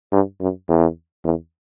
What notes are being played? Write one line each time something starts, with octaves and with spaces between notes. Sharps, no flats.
G2
F#2
E2
E2